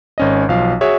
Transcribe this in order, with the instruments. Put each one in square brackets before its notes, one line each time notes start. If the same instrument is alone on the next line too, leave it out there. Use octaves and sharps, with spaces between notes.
[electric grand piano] G#1 C#4 D#5
B1 F3 F5
F#4 G#4 C#5 E5